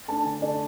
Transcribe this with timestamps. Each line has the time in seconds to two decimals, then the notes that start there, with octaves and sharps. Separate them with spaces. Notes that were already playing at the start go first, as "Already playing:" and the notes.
0.08 A3 D4 A5
0.25 D3 G#5
0.42 A3 D4 D5